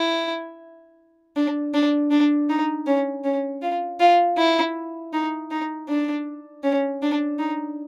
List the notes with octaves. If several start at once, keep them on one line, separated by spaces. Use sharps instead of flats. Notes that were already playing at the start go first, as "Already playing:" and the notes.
Already playing: E4
D4
D4
D4
D#4
C#4
C#4
F4
F4
E4
D#4
D#4
D4
C#4
D4
D#4